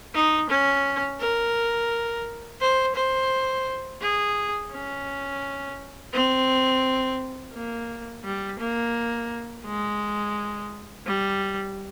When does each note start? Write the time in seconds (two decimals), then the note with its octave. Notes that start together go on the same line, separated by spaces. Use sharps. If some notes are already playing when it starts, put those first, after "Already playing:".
0.14 D#4
0.50 C#4
1.20 A#4
2.60 C5
2.95 C5
4.01 G#4
4.71 C#4
6.13 C4
7.53 A#3
8.24 G3
8.59 A#3
9.65 G#3
11.06 G3